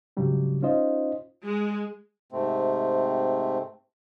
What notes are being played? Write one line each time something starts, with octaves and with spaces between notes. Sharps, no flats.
G#2 C#3 F#3 G3 D4
C#4 D#4 F4 C5 D#5
G#3
G#2 C3 A3 C4